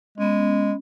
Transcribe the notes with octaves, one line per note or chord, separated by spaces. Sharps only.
G#3 B3 C#4